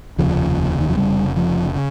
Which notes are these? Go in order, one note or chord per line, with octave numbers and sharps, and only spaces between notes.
F1 D#2 C#3 F3
D#3
F3
F1 D#2 C#3 G3
F3
C#3